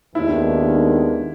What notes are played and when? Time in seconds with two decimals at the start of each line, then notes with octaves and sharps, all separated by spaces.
0.14 D#2 D#3 G#3 B3 D4 E4